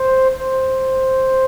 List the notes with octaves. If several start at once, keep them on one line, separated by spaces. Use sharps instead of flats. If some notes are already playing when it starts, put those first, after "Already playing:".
Already playing: C5
C5